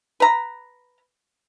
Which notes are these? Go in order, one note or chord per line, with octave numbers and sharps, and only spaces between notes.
B4 A#5